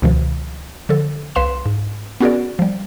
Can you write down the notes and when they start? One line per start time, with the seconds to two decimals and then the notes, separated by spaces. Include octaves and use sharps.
0.02 C#2 B2 D#3 F3
0.89 D3 F3 A4
1.35 C2 B4 F5 C6 E7
1.66 G#2
2.20 B3 C#4 F#4 G#4 A#4 D5
2.59 F3 G3